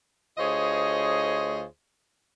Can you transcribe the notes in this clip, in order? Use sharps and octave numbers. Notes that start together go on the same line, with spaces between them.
D2 F4 G#4 C5 C#5 D#5